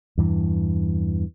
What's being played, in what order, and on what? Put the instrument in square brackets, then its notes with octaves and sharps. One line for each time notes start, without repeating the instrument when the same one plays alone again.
[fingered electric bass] E2 G2 E3